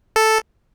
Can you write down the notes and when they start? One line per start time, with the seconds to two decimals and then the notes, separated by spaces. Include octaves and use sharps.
0.16 A4